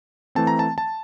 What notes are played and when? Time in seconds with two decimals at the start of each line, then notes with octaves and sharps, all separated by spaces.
0.35 E3 A3 C4 A5
0.47 A#5
0.59 A5
0.78 A5